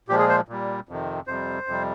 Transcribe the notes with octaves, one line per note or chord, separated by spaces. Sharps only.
A#2 F3 G#3 G4
G#4
C5
A#2 G3
F2 C3 D#3
F2 C3 G3 C5
F2 C3 G3